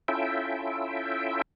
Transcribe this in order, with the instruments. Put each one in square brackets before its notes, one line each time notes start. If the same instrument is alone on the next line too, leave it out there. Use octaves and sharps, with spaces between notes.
[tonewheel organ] C#4 E4 F4 A4 E5 G5